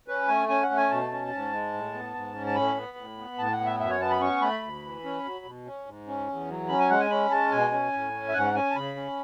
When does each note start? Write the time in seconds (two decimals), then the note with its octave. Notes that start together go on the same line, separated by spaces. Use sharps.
0.08 C#4 B4
0.28 A3 G#5
0.49 C#4 G#5
0.63 F#5
0.70 A3
0.77 G#5
0.90 B2 A5
1.11 C#4
1.32 G#2
1.52 G#3
1.73 A2
1.94 B3
2.14 G#2
2.35 C#4
2.47 A5
2.55 A2 B5
2.77 B3
2.97 A2
3.18 B3
3.38 A2 A5
3.53 F#5
3.58 B3
3.66 E5
3.80 F#2 E5
3.90 C#5
4.00 B3 A5
4.11 B5
4.21 C#4 C#6
4.42 A3 B5
4.62 D2
4.84 E3
5.04 C#4
5.24 F#3
5.45 B2
5.66 C#4
5.86 G#2
6.07 C#4
6.28 E2
6.49 F#3
6.69 C#4 B5
6.79 G#5
6.90 G#3 F#5
7.00 G#5
7.11 C#4 B5
7.30 G#3 A5
7.52 B2 G#5
7.72 C#4
7.93 A2
8.14 C#4
8.29 E5
8.34 G#2 F#5
8.55 C#4 G#5
8.71 A5
8.76 C#3 B5
8.96 C#4